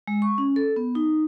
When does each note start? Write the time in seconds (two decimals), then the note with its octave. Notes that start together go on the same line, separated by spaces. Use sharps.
0.07 G#3
0.22 C#6
0.38 C#4
0.56 A4
0.76 B3
0.95 D#4